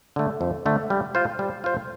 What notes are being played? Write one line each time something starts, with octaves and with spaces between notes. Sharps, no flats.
D3 A3
F2
D3 A3
G3
F4 C5
G3
F4 C5